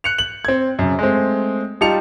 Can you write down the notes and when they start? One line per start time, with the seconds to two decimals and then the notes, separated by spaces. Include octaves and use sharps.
0.04 F#6 C#7 F7
0.18 F#7
0.45 C4 G#6
0.79 F#2 C#3
0.99 G#3 A3 C4
1.81 G3 D#4 F4 A5 C#7 F7